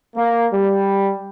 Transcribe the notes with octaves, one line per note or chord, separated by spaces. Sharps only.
A#3
G3